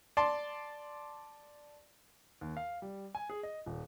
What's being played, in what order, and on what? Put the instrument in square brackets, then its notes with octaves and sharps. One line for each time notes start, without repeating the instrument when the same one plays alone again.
[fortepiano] D5 A5 C6
[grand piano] D#2
F5
G3
G#5
G#4
D#5
D#1